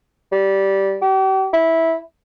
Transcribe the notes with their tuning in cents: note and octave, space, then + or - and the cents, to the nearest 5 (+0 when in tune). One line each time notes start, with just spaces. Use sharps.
G3 -10
G4 -40
E4 -10